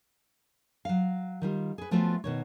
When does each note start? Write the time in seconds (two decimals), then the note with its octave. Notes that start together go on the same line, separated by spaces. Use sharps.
0.85 F#3 F5
1.42 D#3 G3 F4
1.78 G#4 B4
1.91 F3 A3 B3 C#4 F4 F#4
2.24 B2 D#3 C#5